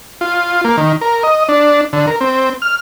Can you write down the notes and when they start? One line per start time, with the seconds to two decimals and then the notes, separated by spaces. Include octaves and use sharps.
0.21 F4
0.64 A#3
0.77 D#3
1.01 A#4
1.23 D#5
1.49 D4
1.93 D3
2.07 A#4
2.21 C4
2.62 F6